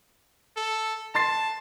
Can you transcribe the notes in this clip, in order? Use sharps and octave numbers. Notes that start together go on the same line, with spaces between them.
A4
A5 C6 A6 C7